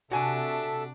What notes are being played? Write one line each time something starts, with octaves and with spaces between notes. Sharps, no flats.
C3 D4 F#4 A4 E5 G#5